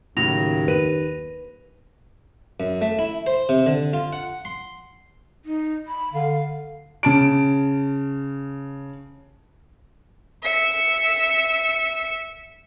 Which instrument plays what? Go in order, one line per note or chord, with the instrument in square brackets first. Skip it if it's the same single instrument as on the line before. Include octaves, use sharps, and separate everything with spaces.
[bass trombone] D#2 [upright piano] A2 C#3 F#3 [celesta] A#6 F7
[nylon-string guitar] B4 [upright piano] D#7
[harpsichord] F#2
A3
E4
C5
C3
D3
F4
F#5
C6
[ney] D#4
B5
[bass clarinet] D3 [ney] F5
[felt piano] C#3 A5 D7
[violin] E5 C#7